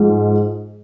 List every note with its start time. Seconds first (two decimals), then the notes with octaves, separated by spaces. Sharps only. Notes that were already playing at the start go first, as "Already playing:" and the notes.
Already playing: G#2 F3 G#3